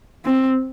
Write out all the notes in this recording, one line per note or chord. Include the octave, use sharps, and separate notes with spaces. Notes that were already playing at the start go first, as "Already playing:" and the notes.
C4